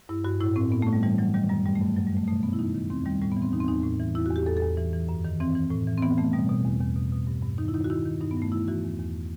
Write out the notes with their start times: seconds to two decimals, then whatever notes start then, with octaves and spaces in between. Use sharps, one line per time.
0.09 G2 E4
0.24 G2 F#4
0.40 A2 E4
0.55 A2 C4
0.72 A2 B3
0.82 A3
0.87 A2
0.93 G3
1.03 E3 G3
1.18 E3 F#3
1.34 D#3 G3
1.50 F#2 G3
1.66 G2 G3
1.76 A3
1.81 G2
1.86 A3
1.96 F#2 F#3
2.07 G3
2.12 D#3 A3
2.27 B2 A3
2.43 B2 B3
2.53 E4
2.59 D#3 D#4
2.75 D#3
2.90 E2 C4
3.06 D#3 G3
3.21 A2 G3
3.31 B3
3.37 E3
3.42 C4
3.52 E2 D#4
3.60 C4
3.68 E2 D#4
3.83 A2
4.00 E3
4.15 E2 E4
4.26 F#4
4.31 E2
4.36 G4
4.46 E2 A4
4.57 A4
4.61 E2
4.77 E3
4.93 E3
5.09 F#2
5.25 D#3
5.40 E3 C4
5.55 E3
5.71 A2
5.87 E3
5.97 C4
6.02 E3 B3
6.18 E3 A3
6.33 B2 G3
6.49 B2
6.65 E2
6.80 E2
6.96 B2
7.12 B2
7.27 G2
7.43 G2
7.58 D#3 D#4
7.68 E4
7.74 D#3 D#4
7.84 F#4
7.90 D#3 E4
8.05 D#3
8.21 G2 D#4
8.31 B3
8.37 G2
8.42 A3
8.52 E3 E4
8.68 E3 F#4
8.84 E2
8.99 E2